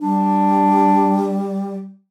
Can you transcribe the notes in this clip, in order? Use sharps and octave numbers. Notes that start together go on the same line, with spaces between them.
G3 D4